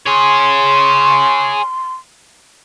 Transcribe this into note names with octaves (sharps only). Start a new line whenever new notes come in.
G#4 C#5 C6